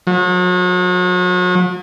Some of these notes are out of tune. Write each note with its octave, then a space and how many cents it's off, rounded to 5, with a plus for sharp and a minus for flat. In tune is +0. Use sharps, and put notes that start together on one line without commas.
F#3 -40